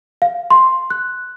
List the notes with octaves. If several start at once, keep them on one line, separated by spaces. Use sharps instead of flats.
F5
C6
F#6